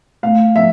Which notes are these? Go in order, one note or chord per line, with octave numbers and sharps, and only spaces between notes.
A3 F5
F3 E5